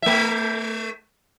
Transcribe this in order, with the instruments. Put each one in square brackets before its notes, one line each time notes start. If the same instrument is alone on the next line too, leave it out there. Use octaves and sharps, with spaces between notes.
[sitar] A3 E5